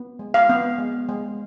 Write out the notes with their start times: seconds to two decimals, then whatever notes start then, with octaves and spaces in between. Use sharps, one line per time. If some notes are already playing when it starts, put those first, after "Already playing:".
Already playing: B3
0.19 G#3
0.34 F5
0.50 B3
0.78 G#3
1.09 G#3